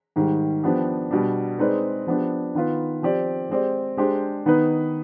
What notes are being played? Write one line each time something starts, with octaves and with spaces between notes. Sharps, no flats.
G#2 D#3 G3
F3 B3 D4 G4
B2 G3 D4
G#3 C4 D#4 B4 D5
F3 B3 D4 G4
D#3 B3 F4 B4
F3 C4 G4 D5
G#3 C4 G4 D5
G#3 D4 G4 C5
D#3 B3 D#4 B4